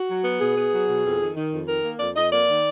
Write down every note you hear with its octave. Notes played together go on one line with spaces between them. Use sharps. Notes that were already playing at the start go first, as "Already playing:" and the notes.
Already playing: F#4
F#3
B3
B2 G#4
B3
F#3
B2
F2
D#3
D#3
F2
D#3 A#4
A#3
F2 D5
F2 D#5
A#3 D5
D#3